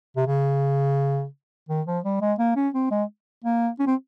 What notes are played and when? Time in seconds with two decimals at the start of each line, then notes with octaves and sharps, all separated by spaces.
0.17 C3
0.27 C#3
1.69 D#3
1.86 F3
2.04 G3
2.21 G#3
2.39 A#3
2.56 C#4
2.74 C4
2.91 G#3
3.44 A#3
3.79 C#4
3.87 C4